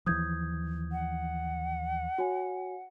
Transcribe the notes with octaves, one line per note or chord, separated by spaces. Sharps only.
D#2 E3 F3 D#6 G6 G#6
F#5
F#4 C#5 G#5